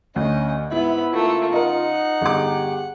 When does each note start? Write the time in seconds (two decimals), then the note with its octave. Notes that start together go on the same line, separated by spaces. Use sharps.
0.16 D2 C#4 D#5
0.72 G#2 B3 E4 E5 B5
1.13 C#3 A3 A#3 F4
1.53 D#4 A#4 D#5 F#5
2.21 G1 G4 G#4 D6